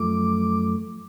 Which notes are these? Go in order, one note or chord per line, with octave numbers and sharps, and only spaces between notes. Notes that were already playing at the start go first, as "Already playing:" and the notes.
Already playing: F#2 F3 A3 D6